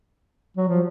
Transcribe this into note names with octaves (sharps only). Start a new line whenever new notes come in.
F#3
F3